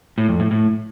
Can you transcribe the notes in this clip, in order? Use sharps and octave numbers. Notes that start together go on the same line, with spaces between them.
A2
F2
A2
A2